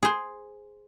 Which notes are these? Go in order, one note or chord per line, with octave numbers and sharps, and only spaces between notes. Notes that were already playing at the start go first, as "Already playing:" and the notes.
G#4 C5